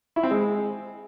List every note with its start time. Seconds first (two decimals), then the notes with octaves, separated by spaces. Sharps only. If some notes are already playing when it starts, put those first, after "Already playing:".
0.16 E4
0.23 C4
0.31 G#3